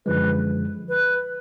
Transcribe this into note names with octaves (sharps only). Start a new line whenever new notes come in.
F#2 D3 F3 G#3 B4
B4